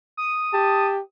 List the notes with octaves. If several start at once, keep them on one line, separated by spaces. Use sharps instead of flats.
D#6
G4 A5